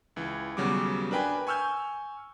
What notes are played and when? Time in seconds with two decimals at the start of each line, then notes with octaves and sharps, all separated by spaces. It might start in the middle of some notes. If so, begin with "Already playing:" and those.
0.16 C#2 E3
0.57 D#2 C#3 F#3 G3 B3 D6
1.11 D4 A#4 B4 G5 G#5 B5
1.47 G#5 C#6 E6 F6 G6